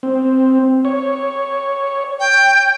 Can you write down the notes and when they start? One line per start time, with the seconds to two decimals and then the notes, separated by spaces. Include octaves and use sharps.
0.03 C4
0.85 C#5
2.20 G5